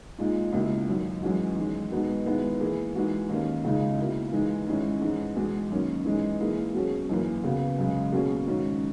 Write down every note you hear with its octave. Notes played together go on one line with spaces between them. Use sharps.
A#2 G#3 D#4
C#2 B2 A#3 E4
F#2 D#3 F#3
F#2 E3 G#3 C#4 F#4
E2 D#3 G#3
B2 G#3 B3 D#4
D#3 G#3 B3 E4
E3 A#3 E4 G#4
E3 G#3 D#4 F#4
D#2 D#3 A#3 C#4
C#2 C#3 G#3 D#4
B2 A#3 E4
E3 G#3 D#4
G#2 D#3 G#3 C#4 E4
G#2 E3 G#3
E2 B2 G#3
F#2 D#3 A#3 C#4
E3 G#3 D#4
E3 A#3 E4 G#4
B2 F#3 C#4 G#4
F#2 E3 A#3
C#3 F#3 B3
F#2 C#3 G#3
B2 A#3 C#4 G#4
G#2 D#3 F#3 C#4